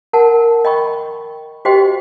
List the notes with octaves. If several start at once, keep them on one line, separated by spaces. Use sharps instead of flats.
A#4 F#5 A5
D#5 G5 B5 C#6
F#4 G4 C5 D#5 G5